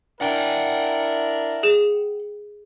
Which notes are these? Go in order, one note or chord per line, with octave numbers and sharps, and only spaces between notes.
D4 E4 A#4 F#5 G5
G#4 E7